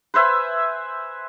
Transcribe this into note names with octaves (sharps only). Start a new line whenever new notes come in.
B4 C5 E5 G#5